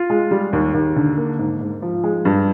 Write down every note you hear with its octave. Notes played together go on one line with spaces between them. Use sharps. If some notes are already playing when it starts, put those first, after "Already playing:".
Already playing: F4
G#3
G3
D#2
D#2
D3
A#3
G#2
G#2
F3
G#3
G2